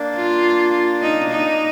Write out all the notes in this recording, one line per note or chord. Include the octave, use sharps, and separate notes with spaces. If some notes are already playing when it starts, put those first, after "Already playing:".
Already playing: A#3 D4
F4
D#4
D#4